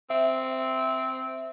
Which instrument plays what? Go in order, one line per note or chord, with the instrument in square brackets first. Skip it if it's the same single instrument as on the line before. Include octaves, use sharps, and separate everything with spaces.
[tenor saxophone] C4 [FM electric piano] E5